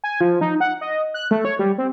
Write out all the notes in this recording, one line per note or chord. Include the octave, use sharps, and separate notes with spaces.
G#5
F3
D#4
F#5
D#5
F#6
A3
C#5
G3
C4